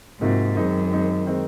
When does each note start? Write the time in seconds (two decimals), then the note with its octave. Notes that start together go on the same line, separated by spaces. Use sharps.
0.20 G#2 C3 F3 A#3 D#4 F#4
0.55 F#2 D#3 G#3 C4 D#4
0.91 D#3 G#3 C4 D#4
1.26 D#3 G#3 C4 D#4